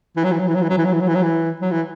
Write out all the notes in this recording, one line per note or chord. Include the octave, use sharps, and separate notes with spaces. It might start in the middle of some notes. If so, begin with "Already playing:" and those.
E3
F#3
E3
F#3
E3
F#3
E3
F#3
E3
F#3
E3
F#3
E3
F#3
E3
F#3
E3